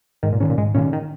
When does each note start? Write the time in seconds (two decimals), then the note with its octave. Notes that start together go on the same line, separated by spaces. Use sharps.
0.23 G#2 D#3
0.32 A#2
0.40 G#2 D#3 C#4
0.49 A#2
0.58 G#2 G#3
0.74 A#2 C#4
0.78 D#3
0.93 D#3